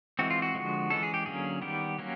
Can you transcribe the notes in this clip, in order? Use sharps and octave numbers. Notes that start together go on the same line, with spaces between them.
E3 G#3 C4 F#4
F4
F#4
D3 F3 G#3
E3 G#3 C#4 A4
G#4
G4
D3 F#3 A#3 C#4 G#4
D#3 G3 B3 G4
F#3 A#3 C#4